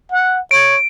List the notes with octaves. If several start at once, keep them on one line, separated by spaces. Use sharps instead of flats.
F#5
C#5 D7